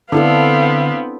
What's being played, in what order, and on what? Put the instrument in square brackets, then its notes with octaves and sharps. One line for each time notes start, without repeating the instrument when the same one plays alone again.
[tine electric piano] D3 [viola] B3 C4 [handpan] D4 E4 A4 [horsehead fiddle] F5